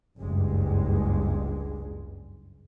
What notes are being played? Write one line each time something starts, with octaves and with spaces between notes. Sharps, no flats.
F#1 C#2 G2 G#3